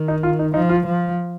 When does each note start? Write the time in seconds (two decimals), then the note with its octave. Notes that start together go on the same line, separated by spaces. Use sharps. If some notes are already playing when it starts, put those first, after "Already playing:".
Already playing: D#3
0.08 D#4
0.23 F4
0.39 D#4
0.54 F3 D#4
0.69 F4
0.86 F3